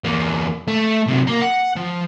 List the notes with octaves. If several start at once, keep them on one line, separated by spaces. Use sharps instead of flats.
E2 A#3
A3
C3 F#3
A#3
F#5
F3